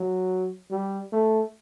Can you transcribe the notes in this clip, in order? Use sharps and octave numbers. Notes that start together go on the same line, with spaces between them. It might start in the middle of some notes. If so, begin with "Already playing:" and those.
Already playing: F#3
G3
A3